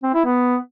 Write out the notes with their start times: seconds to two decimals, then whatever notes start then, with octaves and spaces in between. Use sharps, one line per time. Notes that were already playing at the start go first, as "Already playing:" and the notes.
0.03 C4
0.14 E4
0.25 B3